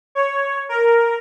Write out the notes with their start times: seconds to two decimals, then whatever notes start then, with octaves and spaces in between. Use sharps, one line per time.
0.15 C#5
0.69 A#4